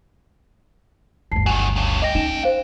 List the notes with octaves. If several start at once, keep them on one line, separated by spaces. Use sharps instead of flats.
G1 D2 A5 C7
D#3 F#3 G#5
G2 C#3
A#3 D#5 G5 A#6
C#4 D#4 E7
C5 F5